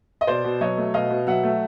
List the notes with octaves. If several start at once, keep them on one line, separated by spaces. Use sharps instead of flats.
D#5
B2 C5 D5
B2
F#3 C#5 D#5
A3
B2 D#5 F5
B2
F#3 E5 F#5
A3